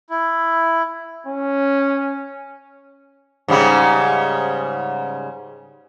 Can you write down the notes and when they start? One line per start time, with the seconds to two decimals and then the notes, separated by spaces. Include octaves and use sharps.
0.10 E4
1.27 C#4
3.48 G#2 C#3 G3